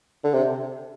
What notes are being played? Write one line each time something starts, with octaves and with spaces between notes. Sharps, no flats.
D3
C3